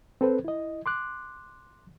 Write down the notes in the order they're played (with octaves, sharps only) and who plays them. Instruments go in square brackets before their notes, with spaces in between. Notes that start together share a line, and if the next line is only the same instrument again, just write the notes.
[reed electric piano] C4 A4 B4 C5
E4 D#5
C6 D6 F#6